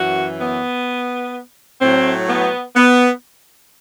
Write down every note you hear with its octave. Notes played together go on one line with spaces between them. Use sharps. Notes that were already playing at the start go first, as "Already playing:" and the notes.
Already playing: F#2 E3 F#4
B3
A2 F#3 C4
B3
B3